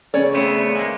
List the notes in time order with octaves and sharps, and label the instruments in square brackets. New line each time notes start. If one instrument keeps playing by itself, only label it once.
[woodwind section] C#3 [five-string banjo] C#4 C#5 D5
[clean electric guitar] A3 B3 C4
G#3 A#3